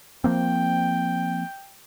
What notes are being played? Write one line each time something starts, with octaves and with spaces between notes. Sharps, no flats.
F3 A#3 C4 G5